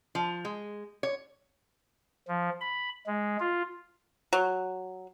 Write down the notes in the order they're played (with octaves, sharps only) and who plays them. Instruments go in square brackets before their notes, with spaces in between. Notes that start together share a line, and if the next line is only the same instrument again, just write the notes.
[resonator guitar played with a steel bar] F3
G#3
C#5
[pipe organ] F3
B5
G#3
F4
[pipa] F#3